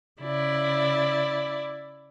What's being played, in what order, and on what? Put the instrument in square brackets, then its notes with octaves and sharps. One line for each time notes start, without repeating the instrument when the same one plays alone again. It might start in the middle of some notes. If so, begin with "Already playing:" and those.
[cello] C#3 [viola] E4 D5